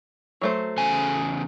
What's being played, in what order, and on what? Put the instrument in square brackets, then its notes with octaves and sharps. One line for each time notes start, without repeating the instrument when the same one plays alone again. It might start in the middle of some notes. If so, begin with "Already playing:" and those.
[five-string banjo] F#3 A3 C5
[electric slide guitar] E2 C#3 G#5